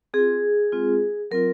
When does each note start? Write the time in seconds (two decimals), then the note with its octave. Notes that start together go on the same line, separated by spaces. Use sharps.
0.14 C4 F4 G#4
0.72 G#3 C4 F4
1.31 F#3 C4 F4 A#4